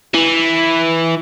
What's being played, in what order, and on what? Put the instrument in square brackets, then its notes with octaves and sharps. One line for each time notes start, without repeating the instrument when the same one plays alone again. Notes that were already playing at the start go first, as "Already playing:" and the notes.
[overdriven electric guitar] E3